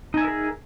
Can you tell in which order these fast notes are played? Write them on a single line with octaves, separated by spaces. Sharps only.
D#4 G#5 E5 A#4 G#4